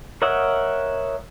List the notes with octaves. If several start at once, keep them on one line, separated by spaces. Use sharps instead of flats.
A#4 C#5 D#5 E5 F#5